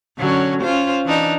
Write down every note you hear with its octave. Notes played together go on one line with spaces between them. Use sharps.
D3 F#3 C#4
C#4 F4 C5
E3 D4 D#4